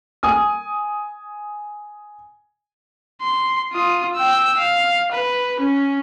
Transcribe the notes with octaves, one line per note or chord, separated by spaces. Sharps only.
G#5 D#6
C6
F4 D#6
G5 E6
F5
B4
C#4